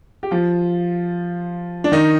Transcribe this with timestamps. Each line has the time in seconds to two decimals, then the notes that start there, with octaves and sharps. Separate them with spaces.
0.23 G4
0.31 F3 F4
1.84 D4
1.92 D#3 D#4